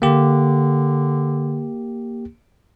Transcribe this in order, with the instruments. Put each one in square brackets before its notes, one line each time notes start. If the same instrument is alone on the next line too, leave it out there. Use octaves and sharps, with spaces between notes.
[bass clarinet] D3 [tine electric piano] A#3 G4